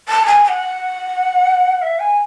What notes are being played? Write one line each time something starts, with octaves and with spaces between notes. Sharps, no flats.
A5
G#5
G#5
F#5
E5
G#5